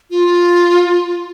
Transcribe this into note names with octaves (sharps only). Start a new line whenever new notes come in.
F4